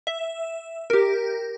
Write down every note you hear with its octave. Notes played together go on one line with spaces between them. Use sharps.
E5
G4 A#4